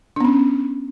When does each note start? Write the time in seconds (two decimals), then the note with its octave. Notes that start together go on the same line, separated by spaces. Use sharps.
0.16 D4
0.20 B3
0.25 C#4